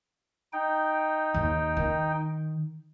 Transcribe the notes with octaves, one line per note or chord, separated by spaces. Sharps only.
D#4 G5
D#2
D#3